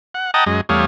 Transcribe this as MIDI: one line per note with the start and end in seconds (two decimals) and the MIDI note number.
0.15 0.31 78
0.34 0.44 75
0.34 0.44 78
0.34 0.44 79
0.34 0.44 81
0.34 0.44 82
0.34 0.44 87
0.46 0.61 42
0.46 0.61 56
0.46 0.61 75
0.69 0.85 40
0.69 0.85 55
0.69 0.85 57
0.69 0.85 73
0.69 0.85 77
0.69 0.85 87